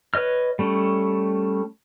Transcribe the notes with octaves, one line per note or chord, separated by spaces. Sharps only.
B4 C#5 D#5 F6
G3 A3 C#4